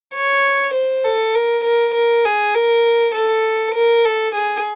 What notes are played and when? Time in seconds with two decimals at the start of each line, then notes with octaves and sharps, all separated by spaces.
0.15 C#5
0.74 C5
1.04 A4
1.34 A#4
1.64 A#4
1.94 A#4
2.25 G#4
2.55 A#4
3.15 A4
3.75 A#4
4.05 A4
4.35 G#4